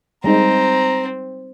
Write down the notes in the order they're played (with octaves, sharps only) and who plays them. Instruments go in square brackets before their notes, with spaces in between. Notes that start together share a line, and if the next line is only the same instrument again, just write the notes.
[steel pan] G3 G#3 D#4 [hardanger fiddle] C4 [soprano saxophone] A#5